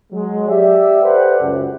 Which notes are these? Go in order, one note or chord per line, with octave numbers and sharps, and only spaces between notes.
F#3 G#3
G4 D5 E5
G4 A4 B4 C5 D5 F#5
C#2 F#2